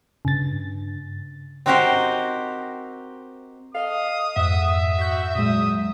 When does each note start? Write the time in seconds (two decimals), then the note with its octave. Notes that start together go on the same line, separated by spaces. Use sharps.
0.25 G2 C#3 A6
1.66 C4 D#4 F#4 G4 A#4 C5
3.75 A4 D#5 F5 D#6
4.36 F2 G#2 E5 F#5
4.99 F#4 G6 B6
5.35 A#2 F#3 G#3 D#6